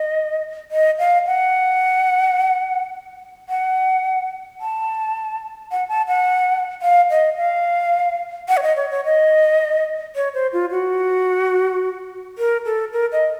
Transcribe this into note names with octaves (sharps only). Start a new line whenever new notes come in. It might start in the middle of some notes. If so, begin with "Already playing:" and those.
Already playing: D#5
D#5
F5
F#5
F#5
A5
F#5
A5
F#5
F5
D#5
F5
F#5
C#5
D#5
C#5
C#5
D#5
C#5
C5
F4
F#4
A#4
A4
A#4
D#5